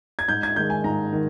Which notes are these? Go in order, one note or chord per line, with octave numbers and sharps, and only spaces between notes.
G#6
G#2 G6
G#6
D#3 G#3 G6
G#5
G#2 A#5
D#3